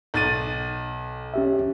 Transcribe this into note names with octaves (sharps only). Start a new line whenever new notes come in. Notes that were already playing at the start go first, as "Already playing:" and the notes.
B1 A6 D#7
C#4 G4 E5